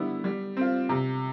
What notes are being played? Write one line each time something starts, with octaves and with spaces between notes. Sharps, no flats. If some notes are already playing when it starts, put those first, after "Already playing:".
Already playing: D3 G3 B3 E4
G3
C4 F4
C3